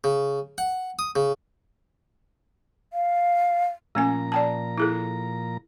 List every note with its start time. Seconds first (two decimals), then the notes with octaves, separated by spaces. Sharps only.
0.04 C#3
0.58 F#5
0.99 D#6
1.16 C#3
2.93 F5
3.95 A#2 F3 A3 C#4 G#5 A#5
4.32 D5 G5 A5
4.78 E4 G#4 A4